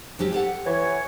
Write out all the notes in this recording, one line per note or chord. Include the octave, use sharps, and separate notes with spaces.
F2 F#3 G4
G4 A4 F#5
E3 C#5